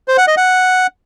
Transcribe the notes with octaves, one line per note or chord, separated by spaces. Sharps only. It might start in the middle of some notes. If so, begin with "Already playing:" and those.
C5
F#5
D#5
F#5